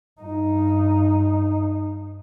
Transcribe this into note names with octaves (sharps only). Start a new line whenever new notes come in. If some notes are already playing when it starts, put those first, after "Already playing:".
G2 D#4